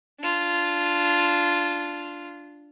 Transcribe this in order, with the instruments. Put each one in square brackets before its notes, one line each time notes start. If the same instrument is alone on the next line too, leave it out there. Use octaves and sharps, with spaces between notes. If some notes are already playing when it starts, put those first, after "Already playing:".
[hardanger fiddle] D4 F4